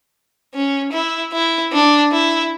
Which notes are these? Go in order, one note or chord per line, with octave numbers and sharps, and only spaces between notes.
C#4
E4
E4
D4
E4